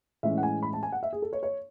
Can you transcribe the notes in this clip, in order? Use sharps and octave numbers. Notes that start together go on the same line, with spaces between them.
A2 E3 G#3 C#4 E5
F#5
G#5
B5
A5
G#5
F#5
E5
G#4
A4
C#5
C#5